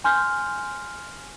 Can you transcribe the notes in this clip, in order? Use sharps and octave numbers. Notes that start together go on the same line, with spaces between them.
G#5 C6 F6 G6